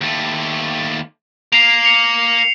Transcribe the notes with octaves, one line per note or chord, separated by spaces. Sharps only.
D#2 A3
A#3 C7 F7
C#7 F7